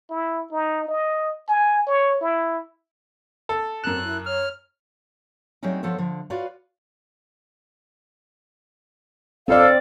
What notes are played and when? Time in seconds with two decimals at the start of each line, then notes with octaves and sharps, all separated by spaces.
0.10 E4
0.52 D#4
0.88 D#5
1.49 G#5
1.87 C#5
2.21 E4
3.49 A4
3.84 F#2 C4 A#4 F#6 E7
4.04 E4
4.26 C#5 F6
5.63 F#3 G3 A3 C4 C#4 D#4
5.83 F3 B3 A4 C5 C#5
5.98 D3 F3
6.30 F4 F#4 B4 C#5 D5 F5
9.48 F2 C4 A4 D5 F5